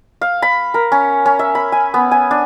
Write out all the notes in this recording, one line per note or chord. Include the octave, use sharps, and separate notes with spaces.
F5
B5
A#4
C#4
C#4
E5
B5
G#5
B3
G#5
D4